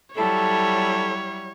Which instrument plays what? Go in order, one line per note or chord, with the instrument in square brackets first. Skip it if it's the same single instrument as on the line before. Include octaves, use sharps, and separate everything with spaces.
[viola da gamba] F#3 G3 E4 [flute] A4 [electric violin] C#5